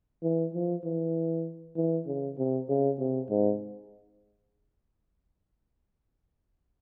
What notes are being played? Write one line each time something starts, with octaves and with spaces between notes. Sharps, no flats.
E3
F3
E3
E3
C#3
C3
C#3
C3
G#2